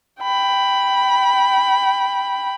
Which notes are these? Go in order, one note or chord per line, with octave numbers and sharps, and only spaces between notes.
G5 B5